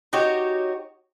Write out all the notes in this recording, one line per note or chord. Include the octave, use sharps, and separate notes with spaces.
D#4 F#4 G4 C#5